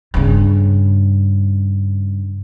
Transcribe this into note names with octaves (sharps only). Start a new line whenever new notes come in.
G2 C#3